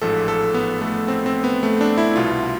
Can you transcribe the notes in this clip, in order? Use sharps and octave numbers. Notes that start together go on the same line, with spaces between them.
A1 G#2 F3 A4
A4
B3
A3
C4
C4
B3
A3
D4
E4
C2 B2 F4